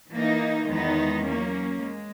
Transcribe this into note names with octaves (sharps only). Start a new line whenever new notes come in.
E3 A#3 D#4
E2 D#3 G#3 B3 D#4
F#3 A#3 C#4
G#3